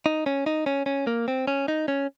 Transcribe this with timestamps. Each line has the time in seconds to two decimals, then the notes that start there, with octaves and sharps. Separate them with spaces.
0.06 D#4
0.26 C#4
0.46 D#4
0.66 C#4
0.86 C#4
1.07 A#3
1.28 C4
1.47 C#4
1.68 D#4
1.88 C#4